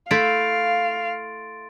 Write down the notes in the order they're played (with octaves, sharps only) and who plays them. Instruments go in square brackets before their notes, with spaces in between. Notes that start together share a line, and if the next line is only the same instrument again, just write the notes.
[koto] A3 E4 [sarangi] F5 [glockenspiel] C6 A6 D7